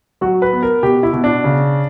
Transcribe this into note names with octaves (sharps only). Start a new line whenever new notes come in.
F#3 F#4
B4
B3
A#4
B2 G4
E4
B2
D4
C#3